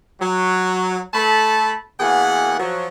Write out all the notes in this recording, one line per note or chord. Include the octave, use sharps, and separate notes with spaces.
F#3
A3 A4 A5 B5
B2 E3 A#3 G#4 F#5
F3 F#3